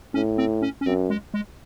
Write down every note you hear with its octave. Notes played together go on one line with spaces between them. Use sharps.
A2 C#4
C4
C#4
C#4
F#2 C4
G#3
G#3